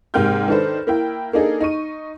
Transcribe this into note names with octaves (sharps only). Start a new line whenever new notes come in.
G#2 C3 A#3 G5 F6 G6
D#3 D4 A4 B4 C5
A#3 E4 G5
A#3 D4 D#4 G#4 A4
D#4 C#6 D#7